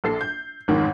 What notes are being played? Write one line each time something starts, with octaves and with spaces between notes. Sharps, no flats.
A#1 A4 C7
G6
A1 F2 G#2 D#3